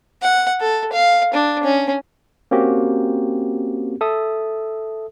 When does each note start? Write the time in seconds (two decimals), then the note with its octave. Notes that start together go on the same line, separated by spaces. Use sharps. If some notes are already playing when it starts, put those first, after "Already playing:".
0.22 F#5
0.61 A4
0.92 F5
1.34 D4
1.63 C#4
2.51 A#3 C4 C#4 F#4 G4
4.01 A4 E5 D#6